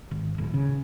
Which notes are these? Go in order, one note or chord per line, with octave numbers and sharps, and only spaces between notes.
G#1
D1
C#3